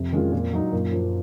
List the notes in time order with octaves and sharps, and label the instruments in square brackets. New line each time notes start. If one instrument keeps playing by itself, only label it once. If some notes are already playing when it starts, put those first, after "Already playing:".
Already playing: [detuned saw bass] F2 [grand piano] C3
[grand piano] D#3 G#3 C#4 F4
A#2
F#3 A#3 D#4
[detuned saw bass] F#2 [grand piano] A#2
[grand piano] F3 A#3